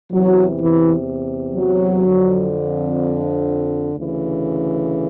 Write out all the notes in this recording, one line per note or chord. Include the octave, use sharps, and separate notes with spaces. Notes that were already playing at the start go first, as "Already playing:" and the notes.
E2 C3 E3 F#3
E3
F#3
F2 D3
D2 C#3 E3